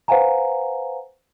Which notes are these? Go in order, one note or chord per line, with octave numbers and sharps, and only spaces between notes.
B4 C5 F5 F#5 G#5 A#5